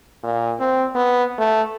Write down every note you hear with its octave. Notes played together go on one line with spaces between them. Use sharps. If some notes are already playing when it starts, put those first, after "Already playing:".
A#2
C4
B3
A3